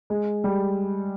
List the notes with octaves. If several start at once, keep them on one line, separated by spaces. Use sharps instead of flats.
G#3
G3